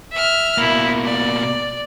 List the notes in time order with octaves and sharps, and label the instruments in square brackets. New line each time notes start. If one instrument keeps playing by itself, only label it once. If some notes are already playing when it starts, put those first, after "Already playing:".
[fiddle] E5 F6
[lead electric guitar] B2 A#3 [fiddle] E4
[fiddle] D5